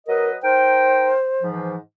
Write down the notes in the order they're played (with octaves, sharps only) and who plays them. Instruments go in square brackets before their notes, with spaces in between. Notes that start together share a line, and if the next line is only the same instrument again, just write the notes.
[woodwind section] F#3 B4 D#5 [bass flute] A#4
[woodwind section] D#4 A#4 G5 [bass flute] C5
[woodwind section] G#2 E3 F3